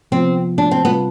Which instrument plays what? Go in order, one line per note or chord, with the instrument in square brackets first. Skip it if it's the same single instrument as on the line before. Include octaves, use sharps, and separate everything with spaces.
[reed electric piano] C3 F3 B3 F4 [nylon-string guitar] C4
[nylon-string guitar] D4
C4
[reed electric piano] C3 G3 C4 F4 [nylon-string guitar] B3